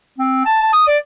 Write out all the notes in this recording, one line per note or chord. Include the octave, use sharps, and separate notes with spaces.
C4
A5
A5
D#6
D5